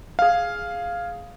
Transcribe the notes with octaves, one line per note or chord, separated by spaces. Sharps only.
G#4 F5